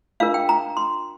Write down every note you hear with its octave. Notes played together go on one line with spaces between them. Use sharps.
D4 F4 A#4 F5
G5
A#5
C6